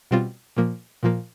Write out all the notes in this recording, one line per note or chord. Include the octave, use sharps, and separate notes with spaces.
B2 G3 C4 F4
A#2 F3 A#3
A#2 F3 A#3